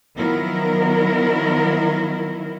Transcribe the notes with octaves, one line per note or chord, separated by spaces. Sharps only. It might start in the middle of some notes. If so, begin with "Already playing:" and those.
D#3 F3 F#3 B3 E4 A#4